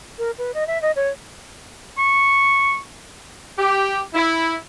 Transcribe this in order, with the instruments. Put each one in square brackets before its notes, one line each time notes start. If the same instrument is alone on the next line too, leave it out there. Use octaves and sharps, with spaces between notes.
[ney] A#4
B4
D#5
E5
D#5
C#5
[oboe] C#6
[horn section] G4
E4